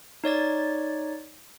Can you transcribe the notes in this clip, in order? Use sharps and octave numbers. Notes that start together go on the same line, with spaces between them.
D#4 C#5 D5 A6